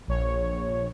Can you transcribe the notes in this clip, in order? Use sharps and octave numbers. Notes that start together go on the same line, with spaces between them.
A#1 C#5